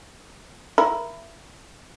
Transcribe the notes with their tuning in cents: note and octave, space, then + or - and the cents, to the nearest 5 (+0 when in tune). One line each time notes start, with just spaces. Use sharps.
E4 +20 A#4 +15